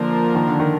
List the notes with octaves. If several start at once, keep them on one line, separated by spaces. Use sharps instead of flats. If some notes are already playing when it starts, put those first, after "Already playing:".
Already playing: D3 F3 A#3 D4 F4 A#4
D#3
D3
D#3